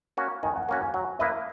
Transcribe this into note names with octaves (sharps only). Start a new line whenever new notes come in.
A#3 C#4 F#4
D#3 G#5
F#5
A#3 C#4 F#4 F#5
G#5
F#3 F#5
A#3 E4 B4 D#5 E5